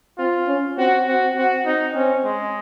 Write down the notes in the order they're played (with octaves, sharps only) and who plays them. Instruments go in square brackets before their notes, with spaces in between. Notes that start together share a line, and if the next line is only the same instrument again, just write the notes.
[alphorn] C4 [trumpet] F4
[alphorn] C#4
[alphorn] C4 [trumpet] F#4
[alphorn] C4 [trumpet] F#4
[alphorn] C4 [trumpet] F#4
[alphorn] C4 [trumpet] D#4
[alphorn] C4 [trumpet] C#4
[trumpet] G#3